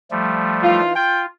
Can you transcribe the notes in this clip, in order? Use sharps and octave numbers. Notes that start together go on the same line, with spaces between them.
F3 G3 A3
E3 D#4 F4
F4 G5